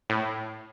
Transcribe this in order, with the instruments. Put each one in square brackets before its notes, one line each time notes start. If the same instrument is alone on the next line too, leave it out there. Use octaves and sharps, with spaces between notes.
[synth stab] A2